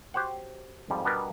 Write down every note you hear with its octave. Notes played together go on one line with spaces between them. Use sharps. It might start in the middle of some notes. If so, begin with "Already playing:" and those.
F#4 G4 C5 C#5 F#5
F2 G#2 F3 G3
B2 G3 B3 D4 A#4 B4